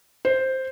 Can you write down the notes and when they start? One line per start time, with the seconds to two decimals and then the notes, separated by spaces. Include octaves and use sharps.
0.25 C5